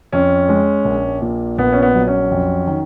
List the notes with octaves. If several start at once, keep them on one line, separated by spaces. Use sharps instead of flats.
F2 C#4
G#3
A#1
A#2
A#1 B3
C#4
B3
F#3
C#4
F2
D#3